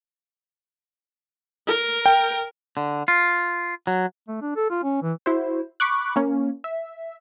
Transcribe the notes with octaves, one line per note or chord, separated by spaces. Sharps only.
A#4
G5
D3
F4
F#3
A3
D4
A4
F4
C#4
E3
E4 F#4 C5
B5 C#6 D6 F#6
A#3 C#4
E5